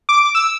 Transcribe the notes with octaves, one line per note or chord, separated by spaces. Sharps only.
D6
E6